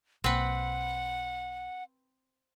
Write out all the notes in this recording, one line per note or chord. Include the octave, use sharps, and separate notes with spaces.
B1 A#3 C4 B4 F#5